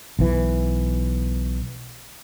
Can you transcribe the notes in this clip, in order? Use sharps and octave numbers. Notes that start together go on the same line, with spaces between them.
B1 E3